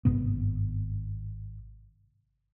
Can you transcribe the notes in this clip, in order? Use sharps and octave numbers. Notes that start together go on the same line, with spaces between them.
G#1 G2 C3 B3